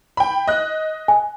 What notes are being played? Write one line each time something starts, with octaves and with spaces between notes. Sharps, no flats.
G5 B5
D#5 F#6
G#5